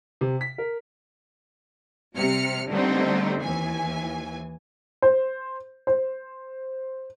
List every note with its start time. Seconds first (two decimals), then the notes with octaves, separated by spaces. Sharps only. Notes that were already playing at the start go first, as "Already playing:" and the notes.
0.21 C3
0.41 B6
0.58 A#4
2.16 C3 G3 F6 C#7
2.69 D3 G3 A3 B3 C4 D#4
3.42 D#2 E3 G#5
5.02 C5
5.87 C5